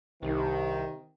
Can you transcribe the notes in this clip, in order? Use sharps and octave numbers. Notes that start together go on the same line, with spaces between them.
C2 C3 D#3